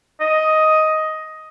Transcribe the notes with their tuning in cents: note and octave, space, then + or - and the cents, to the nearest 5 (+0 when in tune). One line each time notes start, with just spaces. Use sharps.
D#5 +10